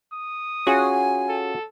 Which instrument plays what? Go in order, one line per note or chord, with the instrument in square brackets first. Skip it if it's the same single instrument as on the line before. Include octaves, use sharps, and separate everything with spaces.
[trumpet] D#6
[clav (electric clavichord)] C#4 F4 G#4 [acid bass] F#4 [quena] G#5
[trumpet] A4